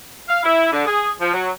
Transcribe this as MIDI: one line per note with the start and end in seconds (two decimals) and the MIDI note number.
0.28 0.43 77
0.43 0.68 64
0.71 0.83 50
0.86 1.10 68
1.20 1.32 53
1.33 1.50 54